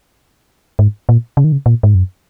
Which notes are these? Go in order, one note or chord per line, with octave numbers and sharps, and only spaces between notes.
G#2
A#2
C#3
D#3
C#3
A#2
G#2
F#2